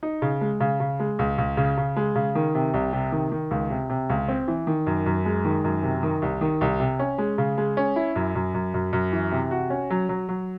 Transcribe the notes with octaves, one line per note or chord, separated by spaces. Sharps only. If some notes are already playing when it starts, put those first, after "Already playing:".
D#4
C#3
G#3
C#3
C#3
G#3
C#2
C#2
C#3
C#3
G#3
C#3
D#3
C3
C2
C3
D#3
D#3
C#2
C3
C3
C#2
C4
E3
D#3
F#2
F#2
G#3
D#3
F#2
C3
D#3
C2
D#3
C2
C3
C#4
G#3
C#3
G#3
C#4
E4
F#2
F#2
F#2
F#2
F#2
E3
C3
F#4
C#4
F#3
F#3
F#3